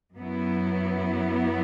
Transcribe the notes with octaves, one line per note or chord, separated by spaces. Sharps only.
F#2 F#3 B3 E4